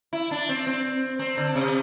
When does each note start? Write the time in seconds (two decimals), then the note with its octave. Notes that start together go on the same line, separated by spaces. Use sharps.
0.13 E4
0.31 D4
0.49 C4
0.67 C4
1.19 C4
1.37 D3
1.55 C3